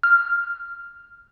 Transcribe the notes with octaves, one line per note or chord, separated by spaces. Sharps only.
F6